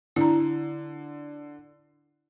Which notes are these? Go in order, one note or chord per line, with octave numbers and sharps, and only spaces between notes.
D3 E4 A#5